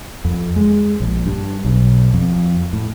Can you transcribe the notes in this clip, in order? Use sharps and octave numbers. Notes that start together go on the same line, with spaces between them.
F2
G#3
A#1
G2
B1
F2
A2